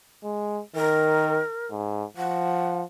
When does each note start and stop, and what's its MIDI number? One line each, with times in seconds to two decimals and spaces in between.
0.24 0.61 56
0.76 1.41 51
0.76 1.67 70
1.71 2.04 44
2.17 2.83 53
2.17 2.80 78